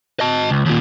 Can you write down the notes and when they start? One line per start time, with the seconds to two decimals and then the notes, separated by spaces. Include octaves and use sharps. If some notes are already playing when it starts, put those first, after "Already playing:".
0.20 D#5 A5
0.50 C#2
0.66 D#2 A#2